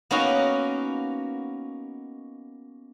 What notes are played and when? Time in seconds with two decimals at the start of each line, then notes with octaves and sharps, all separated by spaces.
0.11 A#3 B3 C#4 D#4 F#4